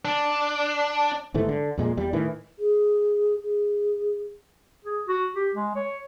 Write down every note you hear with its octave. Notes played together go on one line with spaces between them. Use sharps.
D4
G1 G#2 E3 A3
D3
F2 A#2 G#3
E2 G3
A2 D#3 E3
G#4
G#4
G#4
F#4
G4
G#3
C#5